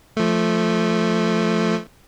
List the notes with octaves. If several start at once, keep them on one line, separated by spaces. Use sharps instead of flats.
F3 A3